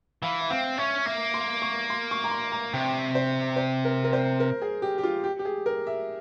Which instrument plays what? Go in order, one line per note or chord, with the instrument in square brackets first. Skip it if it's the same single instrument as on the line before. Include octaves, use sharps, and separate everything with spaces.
[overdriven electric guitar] E3 [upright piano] F5
[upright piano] E5
[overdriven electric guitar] C4 [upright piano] F5
[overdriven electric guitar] C#4 [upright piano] E5
[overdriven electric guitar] A#3 [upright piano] E5
[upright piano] C6
C#6
C6
C#6
A#5
C6
A#5
[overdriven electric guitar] C3 [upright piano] G5
[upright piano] C5
C5
A#4
A#4
C5
A#4
G#4
G4
G4
F4
G4
G4
G#4
A#4
E5